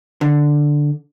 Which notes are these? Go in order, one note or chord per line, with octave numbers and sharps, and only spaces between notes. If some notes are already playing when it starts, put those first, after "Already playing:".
D3